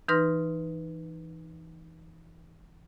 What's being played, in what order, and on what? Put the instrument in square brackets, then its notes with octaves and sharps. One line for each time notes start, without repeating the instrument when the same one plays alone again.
[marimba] E3 D#4 B4 C6 F6 A#6